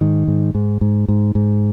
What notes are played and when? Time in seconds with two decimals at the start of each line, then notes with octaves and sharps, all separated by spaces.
0.01 G#2 D#3
0.28 G#2
0.55 G#2
0.81 G#2
1.08 G#2
1.35 G#2